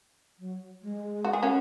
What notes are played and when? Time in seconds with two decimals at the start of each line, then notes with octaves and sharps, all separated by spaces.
0.39 F#3
0.82 G#3
1.24 F#4
1.33 G#4
1.43 C#4 F#4